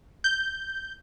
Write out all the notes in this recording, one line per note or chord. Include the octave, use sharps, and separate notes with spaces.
G6